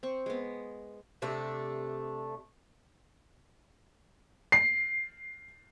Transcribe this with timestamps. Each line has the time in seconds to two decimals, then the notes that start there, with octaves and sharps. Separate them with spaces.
0.03 C4 C#6
0.26 G#3 B3
1.22 C3 A3 D4
4.52 C7